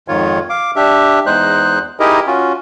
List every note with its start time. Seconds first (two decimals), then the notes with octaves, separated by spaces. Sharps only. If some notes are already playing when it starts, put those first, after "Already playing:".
0.08 F2 G#2 D#3 F4 C#5
0.50 F5 D6
0.76 D4 G4 E5
1.26 E2 G#3 D#4 C5 F#6
2.00 D#4 E4 G4 G#4 A#4 D#5
2.27 C#4 F4 F#4